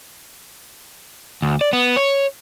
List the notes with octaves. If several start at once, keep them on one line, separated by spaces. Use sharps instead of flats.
D2
D5
B3
C#5